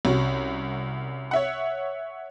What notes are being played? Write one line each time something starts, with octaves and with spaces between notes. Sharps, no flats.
C2 C#4 F#4
C#5 E5 F#5